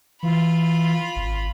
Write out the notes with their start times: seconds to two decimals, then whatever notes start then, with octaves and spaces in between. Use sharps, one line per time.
0.23 E3 F4 B5
1.16 G#1